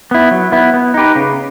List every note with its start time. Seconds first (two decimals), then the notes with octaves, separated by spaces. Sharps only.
0.11 B3 E4
0.31 F#3
0.52 B3 E4
0.74 B3
0.94 D#4 G4 B4
1.16 C#3